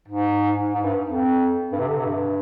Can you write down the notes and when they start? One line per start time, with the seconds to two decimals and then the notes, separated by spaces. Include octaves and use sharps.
0.08 G#2
0.74 G#2
0.85 G2
1.06 F2
1.72 G2
1.80 C3
1.88 D3
1.97 C3
2.05 G2